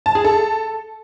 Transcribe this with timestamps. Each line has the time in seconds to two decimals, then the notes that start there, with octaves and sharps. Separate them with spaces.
0.06 A5
0.15 G#4
0.25 A4